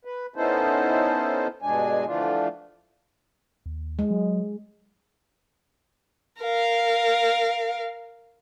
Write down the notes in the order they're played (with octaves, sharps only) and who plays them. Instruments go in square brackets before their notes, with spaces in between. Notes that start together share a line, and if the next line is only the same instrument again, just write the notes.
[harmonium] B4
B3 C#4 D#4 E4 A4 C5
G2 B2 G#3 D4 G#5
D3 E3 F3 A3 D4 F4
[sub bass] D#2
[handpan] G#3
[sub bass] F#3
[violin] A#4 F5